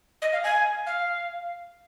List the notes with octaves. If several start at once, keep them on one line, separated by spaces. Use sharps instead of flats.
D#5
F5
G#5
F5